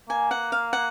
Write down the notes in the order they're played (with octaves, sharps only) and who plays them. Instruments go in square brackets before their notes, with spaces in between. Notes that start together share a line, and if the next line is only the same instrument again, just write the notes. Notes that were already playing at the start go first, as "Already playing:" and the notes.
[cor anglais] A#3 [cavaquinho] G#5
[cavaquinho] F#5
F5
F#5